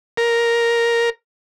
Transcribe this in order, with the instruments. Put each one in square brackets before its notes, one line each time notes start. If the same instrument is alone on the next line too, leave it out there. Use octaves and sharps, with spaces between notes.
[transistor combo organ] A#4